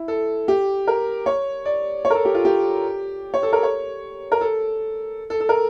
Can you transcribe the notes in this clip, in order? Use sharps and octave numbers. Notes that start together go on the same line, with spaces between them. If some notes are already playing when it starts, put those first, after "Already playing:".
Already playing: E4
A4
G4
A#4
C#5
D5
C#5
A#4
A4
G4
F4
G4
C#5
A4
A#4
C#5
A#4
A4
A4
A4
A#4